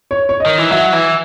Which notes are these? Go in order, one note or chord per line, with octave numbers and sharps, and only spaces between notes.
C#5
C#5
D#5
D#3
E3
F#3 E5
E3